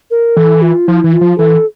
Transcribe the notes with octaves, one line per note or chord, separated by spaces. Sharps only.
A#4
E3 A4
F4
F3 E4
E3
F4
F3
E3 A4